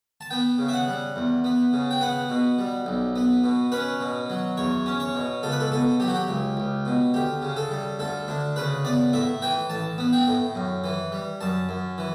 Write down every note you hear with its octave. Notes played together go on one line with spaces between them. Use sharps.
A5
B3 G5
C#3
E5
F#5
G3
E2
B3
C#3
G5
B3 F#5
B2
G3
B1
B3
B2
C#4 B4
B2
F#3
E2 C#5
C#4
C#5
B2
C#2 A4
B4
A4
B2 A4
F#3 G4
F#4
G4
C#2
C#2
B2
D2 G4
C#3
A4
G3
D2 A4
D2 D4
C#3 B4
B3 D5
A2 E5
E3 G5
A1 A5
B3
G5
A2
F#2
E3
G3
F#2 A5
F#2
E3